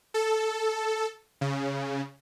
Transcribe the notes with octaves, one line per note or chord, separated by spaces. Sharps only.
A4
C#3